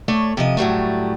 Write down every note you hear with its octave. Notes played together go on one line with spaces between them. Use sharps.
A3 C#5 D5
C3 F3 D#5
A2 F#3 G3 A3